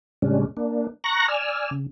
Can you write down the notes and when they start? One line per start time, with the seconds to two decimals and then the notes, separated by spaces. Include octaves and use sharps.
0.22 A2 C#3 G3 G#3 C#4 D4
0.57 A#3 D4
1.04 A#5 C#6 F#6 A#6
1.28 D5 G#5 E6 F6
1.71 C#3